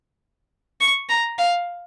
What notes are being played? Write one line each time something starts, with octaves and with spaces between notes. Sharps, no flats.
C#6
A#5
F5